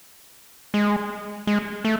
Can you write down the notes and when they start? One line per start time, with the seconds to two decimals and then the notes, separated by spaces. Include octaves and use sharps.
0.74 G#3
1.47 G#3
1.85 A3